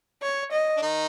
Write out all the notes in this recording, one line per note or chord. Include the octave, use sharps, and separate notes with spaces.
C#5
D#5
D4
D#3 D#4